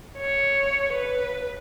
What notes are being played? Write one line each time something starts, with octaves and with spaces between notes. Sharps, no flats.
C#5
B4